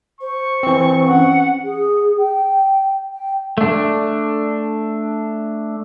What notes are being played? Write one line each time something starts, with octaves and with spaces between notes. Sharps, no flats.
C5 C#6
E3 C4
C#4 F#5
G#4
G5
G5
A3 D4